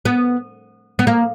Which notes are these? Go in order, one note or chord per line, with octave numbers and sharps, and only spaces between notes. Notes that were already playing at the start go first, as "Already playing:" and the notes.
B3
B3
A#3